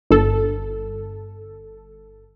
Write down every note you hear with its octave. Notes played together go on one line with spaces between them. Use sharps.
G1 A4